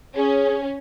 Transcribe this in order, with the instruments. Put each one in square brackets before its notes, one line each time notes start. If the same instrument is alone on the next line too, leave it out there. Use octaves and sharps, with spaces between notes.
[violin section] C#4 [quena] G#4